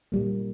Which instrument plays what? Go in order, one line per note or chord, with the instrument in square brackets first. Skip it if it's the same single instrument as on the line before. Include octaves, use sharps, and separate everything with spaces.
[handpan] A#2 G3 A#3